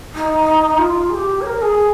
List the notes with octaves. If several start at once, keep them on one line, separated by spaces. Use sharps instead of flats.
D#4
F4
G#4
G4
C#5
A#4
G#4